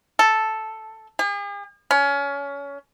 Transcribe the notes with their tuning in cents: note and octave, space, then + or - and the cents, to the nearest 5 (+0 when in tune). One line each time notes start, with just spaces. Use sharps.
A4 +0
G#4 -45
C#4 +25